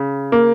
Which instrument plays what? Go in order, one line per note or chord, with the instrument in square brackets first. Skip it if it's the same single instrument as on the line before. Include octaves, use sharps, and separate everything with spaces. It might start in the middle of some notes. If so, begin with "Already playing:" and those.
Already playing: [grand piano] C#3
A#3